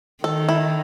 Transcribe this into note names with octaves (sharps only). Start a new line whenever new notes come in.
D#3 A4
E4